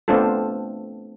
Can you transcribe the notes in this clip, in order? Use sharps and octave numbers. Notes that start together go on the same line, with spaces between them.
A3 B3 C4 D4 F4 A4